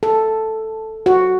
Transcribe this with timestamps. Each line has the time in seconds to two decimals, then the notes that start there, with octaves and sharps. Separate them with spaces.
0.03 A4
1.06 F#4